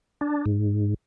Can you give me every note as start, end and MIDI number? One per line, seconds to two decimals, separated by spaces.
0.21 0.45 62
0.46 0.94 44